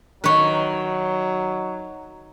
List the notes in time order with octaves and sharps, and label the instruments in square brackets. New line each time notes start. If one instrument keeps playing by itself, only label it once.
[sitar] D#3 [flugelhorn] F#3 [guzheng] B4 C#5